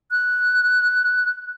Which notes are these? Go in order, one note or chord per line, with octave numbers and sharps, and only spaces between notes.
F#6